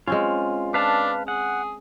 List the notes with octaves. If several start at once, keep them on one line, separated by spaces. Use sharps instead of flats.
G#3 C4 C#4 F4
D4 B4 F5 A5
G#4 F#5